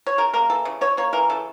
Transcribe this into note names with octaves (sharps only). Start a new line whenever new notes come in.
C#5
C#3 A#4
A#3 A#4
E3 A4
C#3
C#3 C#5
A#3 C#5
E3 A#4
C#3 A4